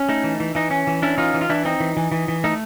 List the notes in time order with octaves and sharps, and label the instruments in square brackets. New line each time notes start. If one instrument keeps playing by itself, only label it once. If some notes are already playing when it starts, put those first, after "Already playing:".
Already playing: [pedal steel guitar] C#4
A3 D#4
E3
E3
E3 D#4
C#4
E3
C#4 D4 E4
E3 D#4 F4
E3
F4
E3 D4 E4
C4 D#4
E3
E3
E3
E3
A3 D#4